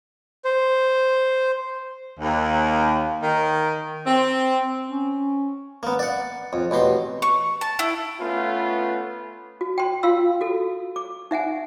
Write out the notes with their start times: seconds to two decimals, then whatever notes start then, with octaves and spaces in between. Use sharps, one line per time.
0.45 C5
2.19 D#2
3.21 D#3
4.06 C4
4.89 C#4
5.83 A#3 B3
5.99 D5 F#5
6.53 F2
6.71 A1 B2 G4 C6
7.22 C#6
7.61 A5
7.79 E4
8.20 A3 B3 C#4 F4 B4
9.61 F#4
9.78 G5 C6
10.03 F4 F5 C6 E6
10.41 F#4 A4
10.96 D6
11.31 D#4 E5 F#5 G#5